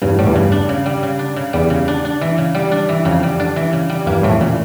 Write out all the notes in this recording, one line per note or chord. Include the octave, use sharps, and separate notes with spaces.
E2 G2 C#3
A2 G3
E2 G2
C#3
D4
C#3
G3
C#3
D4
C#3
E2 G3
C#3
D4
D4
E3
C#3
G3
D4
E3
F2 C#3
G3
D4
E3
C#3
G3
E2 G2 A#3
F2 A2 E3
A#2 C#3